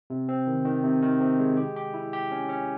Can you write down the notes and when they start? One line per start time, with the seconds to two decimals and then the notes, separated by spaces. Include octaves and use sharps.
0.10 C3
0.29 C4
0.47 D#3
0.65 D#3
0.84 C3
1.02 D#3
1.20 C3
1.39 G#3
1.57 G4
1.76 G4
1.94 E4
2.13 G4
2.32 C#4
2.49 C#4